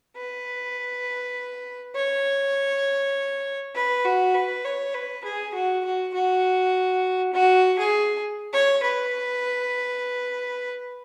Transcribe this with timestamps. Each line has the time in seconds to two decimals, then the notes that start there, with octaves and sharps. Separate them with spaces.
0.17 B4
1.95 C#5
3.75 B4
4.05 F#4
4.35 B4
4.65 C#5
4.94 B4
5.25 G#4
5.54 F#4
5.85 F#4
6.14 F#4
7.33 F#4
7.79 G#4
8.53 C#5
8.83 B4